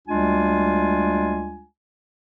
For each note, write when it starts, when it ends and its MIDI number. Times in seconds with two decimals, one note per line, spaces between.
0.08 1.64 38
0.08 1.64 55
0.08 1.64 56
0.08 1.64 62
0.08 1.64 65
0.08 1.64 80